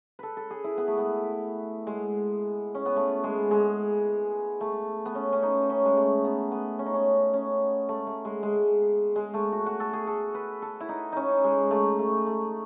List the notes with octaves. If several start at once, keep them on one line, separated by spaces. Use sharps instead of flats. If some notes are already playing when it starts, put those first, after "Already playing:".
A4 B4
A4
G#4
E4
B3
A3
B3
G#3
C#4
B3
A3
G#3
G#3
A3
B3
C#4
C#4
D#4
C#4
G#3
A3
B3
B3
C#4
D#4
C#4
C#4
A3
A3
G#3
G#3
G#3
A3
F#4
F#4
A4
G#4
A4
B4
A4
E4
D#4
C#4 D#4
G#3
A3
A3
A3